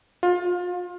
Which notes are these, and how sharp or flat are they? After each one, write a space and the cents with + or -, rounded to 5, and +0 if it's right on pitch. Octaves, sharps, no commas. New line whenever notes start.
F4 +30